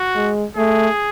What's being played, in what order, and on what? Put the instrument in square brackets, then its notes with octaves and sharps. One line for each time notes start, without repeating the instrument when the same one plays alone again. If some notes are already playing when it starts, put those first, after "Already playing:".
Already playing: [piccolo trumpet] F#4
[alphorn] G#3
[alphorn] A3 [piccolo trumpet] G#4